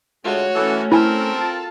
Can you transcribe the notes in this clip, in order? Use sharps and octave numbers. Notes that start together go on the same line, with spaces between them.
D2 G#3 A3 F4 F#4 C#5
E3 A3 C#4 A4
C4 E4 A4 A#4 G#5
F4 A5